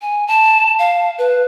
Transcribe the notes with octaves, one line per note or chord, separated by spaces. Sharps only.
G#5
A5
F5
B4